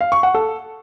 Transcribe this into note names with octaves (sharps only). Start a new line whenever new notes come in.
F5
C#6
F#5
A4